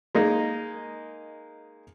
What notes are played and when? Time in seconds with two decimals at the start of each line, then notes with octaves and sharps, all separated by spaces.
0.15 G#3 A#3 D#4